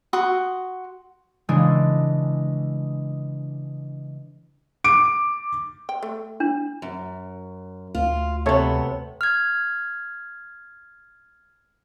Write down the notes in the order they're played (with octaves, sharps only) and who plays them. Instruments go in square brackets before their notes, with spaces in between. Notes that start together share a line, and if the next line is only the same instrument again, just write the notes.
[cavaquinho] F#4 C6 D#6
[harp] C#3 E3 G#3 D4
[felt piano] D6 D7
[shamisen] G5
A3
[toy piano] D4
[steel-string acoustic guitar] F#2
[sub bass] D2 [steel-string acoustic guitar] F4
[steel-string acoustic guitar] C3 B3 [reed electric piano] A4 C#5 E5
[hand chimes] F6 G#6